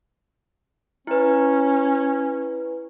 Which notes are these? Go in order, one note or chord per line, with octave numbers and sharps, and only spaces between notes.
C#4 E4 B4